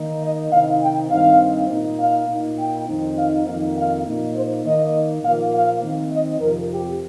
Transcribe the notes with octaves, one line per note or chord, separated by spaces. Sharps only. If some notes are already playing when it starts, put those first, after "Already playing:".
Already playing: D#3 A#3 D#4
D#5
C3 D#3 C4 D#4 F5
G5
G2 D#3 C4 D#4 F5
A#2 A#3 D#4
F5
A#2 A#3 D#4
G5
F2 D#3 C4 D#4
F5
F2 D#3 A#3 D#4 F5
F5
A#2 A#3 D#4
C5
D#3 A#3 D#4 D#5
A#2 F3 A#3 F5
F5
D#3 C4 D#4
D#5
F2 C3 F3 A#4
G4